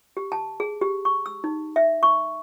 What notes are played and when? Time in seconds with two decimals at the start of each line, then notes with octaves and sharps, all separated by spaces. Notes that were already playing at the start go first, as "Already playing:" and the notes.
0.17 G4
0.32 A5
0.60 G#4
0.81 G4
1.05 C#6
1.26 E6
1.44 D#4
1.76 E5
2.03 C#6